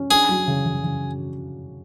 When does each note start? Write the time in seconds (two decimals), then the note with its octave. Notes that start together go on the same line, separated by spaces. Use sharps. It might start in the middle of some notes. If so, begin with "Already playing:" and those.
Already playing: C#4
0.10 D4 G#4
0.29 F#3
0.48 C#3
0.66 C#3
0.83 C#3